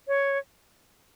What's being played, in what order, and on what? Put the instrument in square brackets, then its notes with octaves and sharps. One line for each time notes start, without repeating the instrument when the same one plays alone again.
[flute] C#5